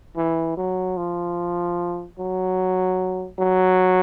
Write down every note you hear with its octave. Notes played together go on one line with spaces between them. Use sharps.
E3
F#3
F3
F#3
F#3